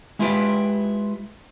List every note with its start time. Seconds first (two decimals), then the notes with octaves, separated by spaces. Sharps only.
0.19 G#3 E4 F4 G4 B4 G5